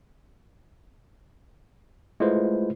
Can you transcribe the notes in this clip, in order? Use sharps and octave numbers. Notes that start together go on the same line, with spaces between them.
G#3 A3 E4 F4 B4 C5